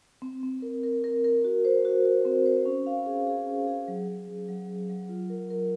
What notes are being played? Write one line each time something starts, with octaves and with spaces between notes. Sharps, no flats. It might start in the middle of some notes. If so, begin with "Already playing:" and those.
C4
C4
A#4
A#4
A#4
A#4
F#4
C5
F#4
C5
C4
C5
C#4
F5
G#4
G#4
C#4
G#4
F#3
F#3
F#3
F#3
F#3
F#3
F4
A#4
A#4